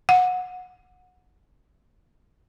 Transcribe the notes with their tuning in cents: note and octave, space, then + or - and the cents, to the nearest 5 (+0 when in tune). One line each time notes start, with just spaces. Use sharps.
F#5 -20